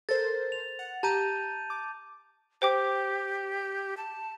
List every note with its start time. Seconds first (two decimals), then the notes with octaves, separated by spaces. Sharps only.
0.09 A4 A#4 C5 A6
0.52 F7
0.79 F#5
1.03 G4 A5 A#5 G6 D#7
1.70 D6
2.62 G4 C5 G5 D6
3.97 A5